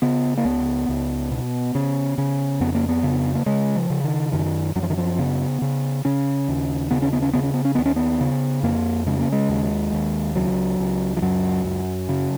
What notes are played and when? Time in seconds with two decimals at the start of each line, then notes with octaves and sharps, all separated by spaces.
0.02 C#3 B3
0.37 A#3
0.45 C#2 B3
0.89 C#2
1.31 B2
1.75 C#3
2.18 C#3
2.60 F2 B3
2.75 A#3
2.89 B3
3.03 C#3
3.35 A#3
3.46 C#3 G#3
3.76 F3
3.90 C#3
4.04 D#3
4.32 F#2 D#3
4.75 F#2 F#3
4.83 F3
4.90 D#3
4.97 F3
5.19 C#3 B3
5.62 C#3
6.05 C#3 C#4
6.48 D#2
6.91 C#3 B3
7.02 C#4
7.13 B3
7.22 C#4
7.33 C#3 B3
7.44 C#4
7.54 B3
7.65 C#4
7.75 D#2 B3
7.85 C#4
7.96 B3
8.21 C#3
8.63 F2 A#3
9.07 C#3 G#3
9.19 A#3
9.32 G#3
9.49 D#2
9.93 D#2
10.35 C#2 F#3
10.79 C#2
11.17 F3
11.22 F#2 F#3
11.65 F#2
12.09 C#3